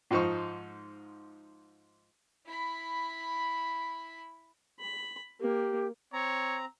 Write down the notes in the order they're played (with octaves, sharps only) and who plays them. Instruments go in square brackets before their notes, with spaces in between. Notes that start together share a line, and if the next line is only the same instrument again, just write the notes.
[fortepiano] G#2 F3 D#4 C5 C#6
[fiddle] E4 B5
[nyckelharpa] B5
[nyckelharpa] A#3 [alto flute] G4
[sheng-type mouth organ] C4 A#5 [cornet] C#5